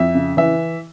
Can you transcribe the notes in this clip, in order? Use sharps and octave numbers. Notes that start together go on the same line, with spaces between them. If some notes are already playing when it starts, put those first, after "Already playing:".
Already playing: F2 E5
C#3
E3 E5